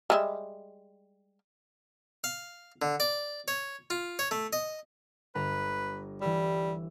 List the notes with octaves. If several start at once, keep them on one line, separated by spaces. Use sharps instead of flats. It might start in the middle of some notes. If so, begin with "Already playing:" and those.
G3 G#3 E5
F5
D3
D5
C#5
F4
C#5
A3
D#5
G1 B4 A#5
E3 G3 E6